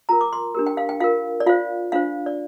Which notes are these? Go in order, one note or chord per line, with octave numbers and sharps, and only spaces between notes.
F4 A#4 A#5
D6
C6
D4 G4 A#4
G5
F5
G5
F4 A#4 F5
D5
F4 C5 F5
D4 F4 C5 F5
D5